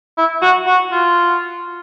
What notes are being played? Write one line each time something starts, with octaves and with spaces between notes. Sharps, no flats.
E4
F#4
F#4
F4